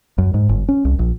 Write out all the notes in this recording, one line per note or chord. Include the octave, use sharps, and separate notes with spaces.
F#2
G#2
G1
C#4
C2
A#1